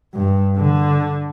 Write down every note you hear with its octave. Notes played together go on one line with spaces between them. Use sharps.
G2
D3